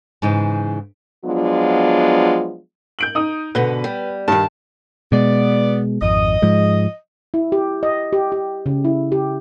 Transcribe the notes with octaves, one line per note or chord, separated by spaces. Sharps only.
G#2 C#3 E3 D#4
F3 F#3 G#3 B3 D4 F4
G6 D7 F#7
D#4 D#6
G#2 B2 D3 B4
G3
G2 D#3 A5
B2 G#3 B3 D5
G#1 F2 D#5
G#2 F3 G#3
E4
G4
D#5
G4
G4
C#3
E4
G4